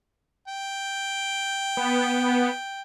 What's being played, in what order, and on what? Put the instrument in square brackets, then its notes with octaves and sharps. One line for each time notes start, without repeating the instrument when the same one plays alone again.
[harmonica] G5
[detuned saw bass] B3